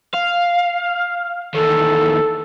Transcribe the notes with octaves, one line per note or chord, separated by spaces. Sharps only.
F5
E2 D#3 A4